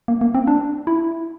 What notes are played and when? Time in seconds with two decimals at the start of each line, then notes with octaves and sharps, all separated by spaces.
0.08 A#3
0.21 A#3
0.35 C4
0.47 D4
0.87 E4